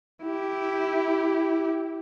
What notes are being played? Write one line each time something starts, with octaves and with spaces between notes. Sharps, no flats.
E4 G4